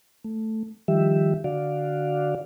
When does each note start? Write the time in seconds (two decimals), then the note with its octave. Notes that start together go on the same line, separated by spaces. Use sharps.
0.24 A3
0.88 D#3 F3 G3 G4 E5
1.44 D3 F#4 D5 F5